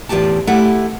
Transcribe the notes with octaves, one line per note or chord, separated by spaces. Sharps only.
E2 A2 F4 G4 A5
A3 E4 G4 F#5